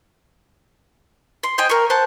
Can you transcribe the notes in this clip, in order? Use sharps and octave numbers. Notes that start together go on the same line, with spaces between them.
C6
C5 D#5 G5 G#5
A#4 C#6
C5 F#5 A5